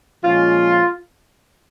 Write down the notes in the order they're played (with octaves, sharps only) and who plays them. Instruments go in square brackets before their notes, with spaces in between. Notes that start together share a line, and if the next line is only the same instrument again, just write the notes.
[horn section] A#2 F3 G#3 C#4 F4